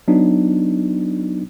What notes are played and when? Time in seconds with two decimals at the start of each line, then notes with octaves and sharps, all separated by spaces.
0.08 F#3 B3 D4 D#4